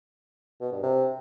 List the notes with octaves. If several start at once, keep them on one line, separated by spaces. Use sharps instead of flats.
B2
G2
C3